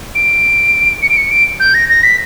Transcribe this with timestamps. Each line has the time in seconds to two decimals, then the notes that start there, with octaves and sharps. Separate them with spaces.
0.15 D7
1.02 C#7
1.10 D7
1.17 C#7
1.31 D7
1.60 G6
1.74 A#6
1.89 A#6
2.03 B6